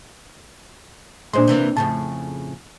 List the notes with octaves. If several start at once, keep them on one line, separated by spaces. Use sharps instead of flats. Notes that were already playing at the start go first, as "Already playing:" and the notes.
A#2 G#3 D4 C5 C6
C3 E3 A#3
F2 A2 C#3 A5